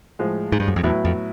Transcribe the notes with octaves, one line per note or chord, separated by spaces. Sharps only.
A2 F3 G#3
G#2
G2
F#2
F2
E2 A2 F#3 B3 E4
F2